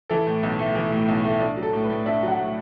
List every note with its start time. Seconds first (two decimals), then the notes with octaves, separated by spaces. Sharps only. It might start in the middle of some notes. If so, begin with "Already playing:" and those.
0.09 E3 A4
0.27 A2
0.43 B1
0.59 A3
0.75 E3
0.92 A2
1.08 B1
1.24 A3
1.40 D4
1.57 F#3
1.63 A4
1.73 A2
1.84 B4
1.90 A2
2.06 D4 E5
2.23 F#3 F#5
2.39 A2